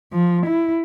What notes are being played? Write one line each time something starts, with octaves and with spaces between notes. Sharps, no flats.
F3
E4